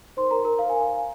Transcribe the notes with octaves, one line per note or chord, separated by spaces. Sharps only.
D#4 A#4 C5 C6
A#4 A#5
A#4 A#5
F5
G#5
F5